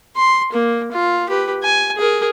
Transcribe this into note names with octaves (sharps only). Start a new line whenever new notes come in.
C6
A#3
F4
G4 B4
G#5
G#4 A#4